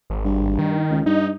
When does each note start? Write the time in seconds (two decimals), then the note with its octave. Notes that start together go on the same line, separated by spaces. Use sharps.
0.10 G#1
0.25 G2
0.58 D#3
0.90 C#2
1.06 G2 D#4